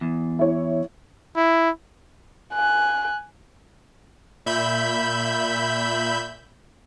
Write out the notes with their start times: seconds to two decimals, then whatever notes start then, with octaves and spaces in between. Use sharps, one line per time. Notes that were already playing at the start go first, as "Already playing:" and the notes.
0.01 E2
0.39 E4 C#5
1.37 E4
2.54 G#5 F#6
4.46 A#2 E5 B5 G6